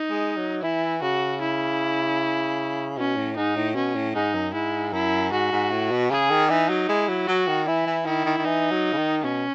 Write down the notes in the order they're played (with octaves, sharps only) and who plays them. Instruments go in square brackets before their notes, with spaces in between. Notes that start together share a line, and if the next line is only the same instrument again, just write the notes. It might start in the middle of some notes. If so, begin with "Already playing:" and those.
Already playing: [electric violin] D#4
[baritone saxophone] G#3
F#3
[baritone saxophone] E3 [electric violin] E4
[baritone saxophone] C#3 [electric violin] F#4
[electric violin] E4
[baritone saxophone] B2 [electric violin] C#4
[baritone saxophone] A2
[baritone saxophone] G#2 [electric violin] D#4
[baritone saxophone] A2
[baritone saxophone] B2 [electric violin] C#4
[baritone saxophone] A2
[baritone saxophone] G#2 [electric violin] D#4
[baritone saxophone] F#2
[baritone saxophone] G#2 [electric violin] E4
[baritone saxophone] F#2 [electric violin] E4
[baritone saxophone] G#2 [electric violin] F#4
[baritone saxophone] G#2
A2
B2
[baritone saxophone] C#3 [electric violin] G#4
[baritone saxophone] D#3
[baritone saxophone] E3 [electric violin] D#4
[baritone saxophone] F#3
[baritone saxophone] G#3 [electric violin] E4
[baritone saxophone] F#3
[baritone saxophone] F#3 [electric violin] F#4
[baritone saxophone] D#3
[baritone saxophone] E3 [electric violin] E4
[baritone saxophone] E3
[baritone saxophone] D#3 [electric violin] E4
[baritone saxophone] D#3
D#3
[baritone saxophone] E3 [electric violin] D#4
[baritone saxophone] F#3
C#3
D#3
[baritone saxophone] B2 [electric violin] C#4